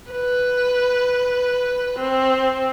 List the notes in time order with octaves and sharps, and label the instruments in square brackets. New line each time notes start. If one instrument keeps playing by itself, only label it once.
[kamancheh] B4
C4